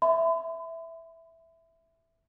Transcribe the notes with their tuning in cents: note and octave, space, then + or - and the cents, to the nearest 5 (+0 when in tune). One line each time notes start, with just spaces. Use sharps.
E5 +0 B5 +45